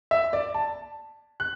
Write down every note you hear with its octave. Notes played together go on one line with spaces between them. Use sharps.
E5
D5
A5
F#6